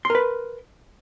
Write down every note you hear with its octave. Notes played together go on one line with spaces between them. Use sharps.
A#4 B4 C6